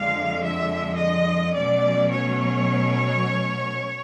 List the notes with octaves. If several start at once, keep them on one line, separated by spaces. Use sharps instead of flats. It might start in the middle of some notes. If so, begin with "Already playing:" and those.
Already playing: F2 D3 F3 G#3 F5
E5
D#5
B2 F#3 A3 C#4 D5
C#5